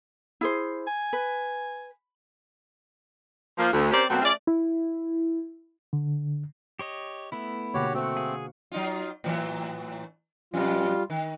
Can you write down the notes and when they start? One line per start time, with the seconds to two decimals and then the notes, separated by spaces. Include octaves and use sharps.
0.41 E4 G#4 C5
0.87 G#5
1.13 B4
3.58 F3 A#3
3.73 D2
3.92 C4 C#4 G4 A#4 C5 D5
4.10 B2 F#3 A3 A#3 C4
4.22 A3 C#4 F4 G#4 D5
4.47 E4
5.93 D3
6.79 G4 C#5 D#5
7.32 A3 B3 E4
7.74 B2 D3 A#3 F#4 G4 C#5
7.94 A3 C4 F#4 C5 F#5
8.17 G#4 F5
8.72 F#3 D#4 F4
9.24 A2 E3 F#3
10.54 F2 B2 G3 F4
11.10 D#3